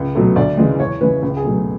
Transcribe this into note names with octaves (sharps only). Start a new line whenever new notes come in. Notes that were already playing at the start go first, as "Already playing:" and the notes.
Already playing: C#2
B2 F#3 A3
D2 D5
C#3 E3 G#3
E2 C#5
C#3 E3 G#3 B4
C#2
G#4
B2 F#3 A3